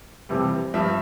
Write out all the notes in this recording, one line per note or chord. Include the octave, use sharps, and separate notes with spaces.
F2 C3 E3 G3
G2 F3 E5